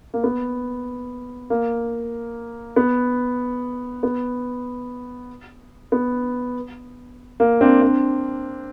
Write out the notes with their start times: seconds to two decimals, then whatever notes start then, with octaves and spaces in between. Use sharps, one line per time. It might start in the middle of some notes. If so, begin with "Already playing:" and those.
0.14 A#3
0.24 B3
1.50 A#3
2.76 B3
4.03 B3
5.92 B3
7.40 A#3
7.61 C4 D4
7.82 C4 D4